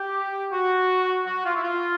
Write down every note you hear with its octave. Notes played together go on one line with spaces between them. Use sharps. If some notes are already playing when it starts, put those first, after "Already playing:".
Already playing: G4
F#4
F#4
F4
E4
F4